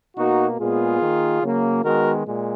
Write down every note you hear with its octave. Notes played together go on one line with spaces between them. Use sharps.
B2 A#3 D#4 F#4
A#2 G#3 B3 F4 G#4
D#3 A#3
C#3 F#3 A#3
D#3 G#3 B3 F#4 A#4
A#2 G#3